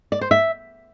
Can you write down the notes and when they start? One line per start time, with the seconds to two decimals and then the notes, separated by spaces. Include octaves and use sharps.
0.12 D5
0.21 C5
0.31 E5